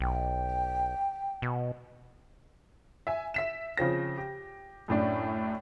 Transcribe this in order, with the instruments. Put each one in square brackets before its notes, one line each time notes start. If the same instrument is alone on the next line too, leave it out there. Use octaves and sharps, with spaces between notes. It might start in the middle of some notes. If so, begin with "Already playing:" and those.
[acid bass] B1 [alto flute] G5
[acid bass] B2
[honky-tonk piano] E5 G#5
E5 B6 E7
C#3 F3 C4 A#6
G4
F#2 A2 D4